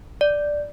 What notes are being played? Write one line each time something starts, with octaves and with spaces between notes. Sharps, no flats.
D5